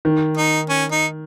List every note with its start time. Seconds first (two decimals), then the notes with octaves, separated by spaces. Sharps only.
0.05 D#3
0.37 D#4
0.69 C#4
0.91 D#4